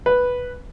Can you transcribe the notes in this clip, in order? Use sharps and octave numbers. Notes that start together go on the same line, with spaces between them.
B4